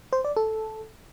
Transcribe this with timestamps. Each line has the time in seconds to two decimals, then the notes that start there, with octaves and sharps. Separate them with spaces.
0.13 C5
0.25 D5
0.37 A4